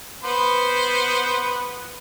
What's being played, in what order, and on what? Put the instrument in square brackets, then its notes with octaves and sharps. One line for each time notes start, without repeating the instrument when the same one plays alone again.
[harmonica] B3 B4 C5